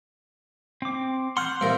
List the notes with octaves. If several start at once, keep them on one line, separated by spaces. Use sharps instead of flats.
C4 D6
F#5 C6 F6 G6
C2 A#2 A#4